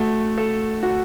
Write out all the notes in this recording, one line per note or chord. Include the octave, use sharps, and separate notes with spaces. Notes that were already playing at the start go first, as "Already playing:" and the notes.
Already playing: A3 F#4
A4
F#4